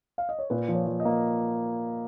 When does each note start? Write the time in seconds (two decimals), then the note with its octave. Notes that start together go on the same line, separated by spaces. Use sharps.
0.18 F5
0.29 D#5
0.39 C#5
0.50 A#2 B4
0.68 F3
0.75 C#5
0.87 F3
1.00 D#5
1.05 A#3